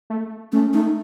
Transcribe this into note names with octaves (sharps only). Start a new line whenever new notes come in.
A3
A3 C#4
A3 D#4